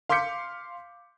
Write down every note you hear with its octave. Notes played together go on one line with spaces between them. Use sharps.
F5 C6 D6 G6 B6 C#7